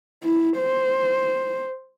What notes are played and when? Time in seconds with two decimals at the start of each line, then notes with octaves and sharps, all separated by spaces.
0.23 E4
0.58 C5